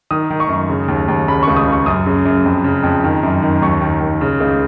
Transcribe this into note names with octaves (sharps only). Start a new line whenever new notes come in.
D#3 D#6
D#3
C#6
F#2
C#3
D#2
D#2
C#3 B5
C#2 C#6
D#6
C#3
C#6
F#2 D#6
C#3
F#2
F2
C#3
F2
D#3
F#2
D#3
D#2 C#6
D#3
D#3
C#3
C#2